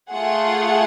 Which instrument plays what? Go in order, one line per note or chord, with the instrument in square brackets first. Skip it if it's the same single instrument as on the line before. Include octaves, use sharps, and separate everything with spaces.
[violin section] A3 F4 G#4 F#5